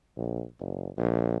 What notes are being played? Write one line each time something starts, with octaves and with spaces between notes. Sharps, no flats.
A#1
F#1
A#1